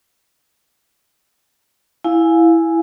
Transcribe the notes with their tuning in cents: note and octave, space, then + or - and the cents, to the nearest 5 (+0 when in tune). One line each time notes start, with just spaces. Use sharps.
E4 +0 F5 +20 G#5 +0